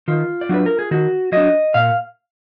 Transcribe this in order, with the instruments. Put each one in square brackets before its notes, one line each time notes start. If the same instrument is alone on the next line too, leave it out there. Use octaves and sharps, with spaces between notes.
[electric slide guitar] D#3 F4
D5
F#3 D4 B4
A#4
G#4
D#3 F#4
F#3 D4 D#5
A#2 F5